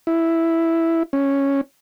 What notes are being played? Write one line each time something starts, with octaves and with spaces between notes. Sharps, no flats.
E4
C#4